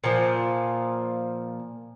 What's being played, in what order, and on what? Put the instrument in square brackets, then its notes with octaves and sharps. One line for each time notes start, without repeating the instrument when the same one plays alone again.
[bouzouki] A#2 F3